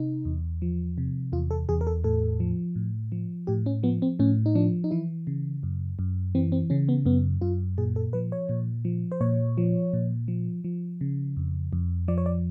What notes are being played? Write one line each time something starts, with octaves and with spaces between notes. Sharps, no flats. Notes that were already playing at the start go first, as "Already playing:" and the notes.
Already playing: C3 D#4
E2
F3
C3
E2 F4
A4
E2 G#4
A#4
A4
A2 A4
F3
A2
F3
A2 G4
C#4
F3 B3
C4
A2 C#4
D#4
F3 D4
D#4
E3 E4
C#3
F#2
F#2
E3 C4
C4
C#3 C#4
B3
F#2 B3
F#2 F4
A#2 G#4
A4
F3 B4
C#5
A#2
F3
C5
A#2 C#5
F3
A#2
F3
F3
C#3
F2
F2
F3 D5
C#5
D5